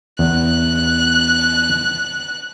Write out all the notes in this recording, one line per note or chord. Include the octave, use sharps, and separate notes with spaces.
E2 F#6